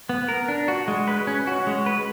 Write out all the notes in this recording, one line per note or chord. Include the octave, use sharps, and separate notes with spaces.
B3
A#4
D4
F#4
G#3
B4
C#4
F#4
G#3
B4